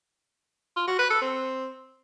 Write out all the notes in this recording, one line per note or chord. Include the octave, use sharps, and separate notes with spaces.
F4
F#4
B4
A4
C4